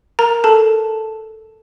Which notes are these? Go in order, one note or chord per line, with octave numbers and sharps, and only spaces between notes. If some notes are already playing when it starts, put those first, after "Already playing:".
A#4 A#5
A4 A5